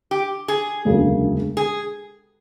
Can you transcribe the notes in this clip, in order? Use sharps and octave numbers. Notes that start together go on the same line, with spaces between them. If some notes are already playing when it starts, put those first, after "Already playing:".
G4
G#4
E1 D2 C#3 F#3 A#3
G#4